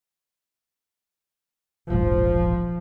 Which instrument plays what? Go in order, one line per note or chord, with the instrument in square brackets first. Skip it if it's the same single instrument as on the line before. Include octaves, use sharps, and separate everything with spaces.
[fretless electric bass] E1 A#1 G#2 [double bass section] F3